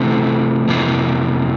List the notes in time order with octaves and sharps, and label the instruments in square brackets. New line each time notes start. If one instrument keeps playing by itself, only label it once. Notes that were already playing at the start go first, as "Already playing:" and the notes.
Already playing: [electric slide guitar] C3 E3 A3
F2 C3 E3 A#3